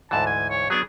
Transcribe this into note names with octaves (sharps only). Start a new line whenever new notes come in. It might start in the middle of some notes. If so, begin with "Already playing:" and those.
D2 G#2 E3 A5
G#5
C#5
F#3 B3 D4 G#4